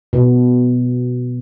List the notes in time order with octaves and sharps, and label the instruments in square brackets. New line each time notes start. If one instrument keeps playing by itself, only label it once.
[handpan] B2